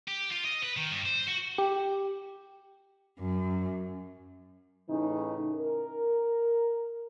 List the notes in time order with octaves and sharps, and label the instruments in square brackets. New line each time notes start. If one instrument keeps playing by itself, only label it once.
[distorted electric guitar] G4
F4
D#5
B4
D#3
G2
C5
F#4
[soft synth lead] G4
[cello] F#2
[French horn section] A2 C#3 E3 D#4
A#4